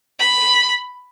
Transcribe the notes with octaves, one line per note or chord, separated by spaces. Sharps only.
B5